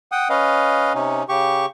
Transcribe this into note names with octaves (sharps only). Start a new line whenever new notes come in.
F#5 G5 D#6
C#4 B4 D#5 F5
C3 C#4 D#4
C#3 G4 C#6